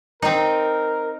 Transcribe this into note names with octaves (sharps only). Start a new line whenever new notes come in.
C4 D#4 A#4